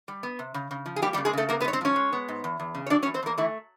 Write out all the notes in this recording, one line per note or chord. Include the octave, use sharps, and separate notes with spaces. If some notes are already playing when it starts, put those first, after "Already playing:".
G3
B3
C3
C#3
C#3
F3
G#4
G3 A#3 G4
G3 G4
C#3
G#3 G#4
C#3 A3 A4
A#3 B3 A#4
B3 B4
G#2 C#5
C4 C5
F3 C#4 C#5
G#3
B3
G#2
E2
E2
C#3
C#5
F#3 D4 D5
C#4 C#5
E2
C4 C5
E2 A#3 A#4
E3 A3 E4